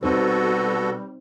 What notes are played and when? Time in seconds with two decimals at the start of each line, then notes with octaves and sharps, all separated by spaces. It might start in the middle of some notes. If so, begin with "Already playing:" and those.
0.03 B2 G3 C4 D#4 F#4 A4 C5